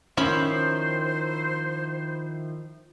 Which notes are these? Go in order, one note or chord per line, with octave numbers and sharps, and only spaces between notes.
D#3 F3 C#4 E4 C5 B5